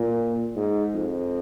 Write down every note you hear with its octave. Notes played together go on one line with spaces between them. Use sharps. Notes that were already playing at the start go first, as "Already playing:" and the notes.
Already playing: A#2
G#2
F2